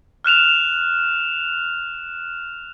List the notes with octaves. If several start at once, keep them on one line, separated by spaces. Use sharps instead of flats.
F6 F#6 E7 F7